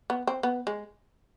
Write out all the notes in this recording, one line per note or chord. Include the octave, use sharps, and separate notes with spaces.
B3
C4
B3
G#3